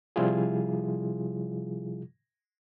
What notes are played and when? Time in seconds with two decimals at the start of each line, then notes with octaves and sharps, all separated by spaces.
0.16 C3 F3 G3 E4 F4 G#4